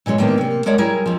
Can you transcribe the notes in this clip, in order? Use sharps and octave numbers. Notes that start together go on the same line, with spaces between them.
A#2 E3 G#3 C#4
A2 D#3 G#3 A#3 B3 D4
C3 A#3
G#3 A#4 C#5 D5 F#5
F#3 G3 E4 G#4 A#4
F2 F3